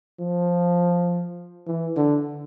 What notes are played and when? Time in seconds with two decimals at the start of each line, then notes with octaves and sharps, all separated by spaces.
0.19 F3
1.67 E3
1.96 D3